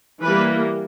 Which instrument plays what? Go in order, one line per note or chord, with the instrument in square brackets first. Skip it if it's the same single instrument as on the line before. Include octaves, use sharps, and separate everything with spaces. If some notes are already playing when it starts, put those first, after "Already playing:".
[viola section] E3 G3 A#3 B4